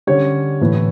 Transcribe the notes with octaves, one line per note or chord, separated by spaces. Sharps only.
D3 G3 C#4 C#5
A2 E3 A3 E4